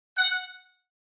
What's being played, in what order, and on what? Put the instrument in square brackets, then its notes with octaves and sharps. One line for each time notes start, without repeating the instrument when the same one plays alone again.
[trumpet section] F#5